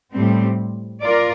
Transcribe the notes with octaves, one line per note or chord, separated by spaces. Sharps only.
A2 G3 C4
F4 A#4 D5